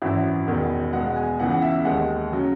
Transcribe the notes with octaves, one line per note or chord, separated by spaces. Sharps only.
G#1 F#2 E3 E5
E1 E2 D#3
E2 B2 G#3 B3 F#5
F#5
G#5
C#2 C#3 E3 B3 F#5
F#5
E5
D#2 D#3 G#3 F#5
C#3 F#3